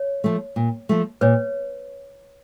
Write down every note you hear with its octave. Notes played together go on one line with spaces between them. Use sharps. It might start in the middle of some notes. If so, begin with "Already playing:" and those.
Already playing: C#5
F3 A3
A#2
F3 A3
A#2 B4 C#5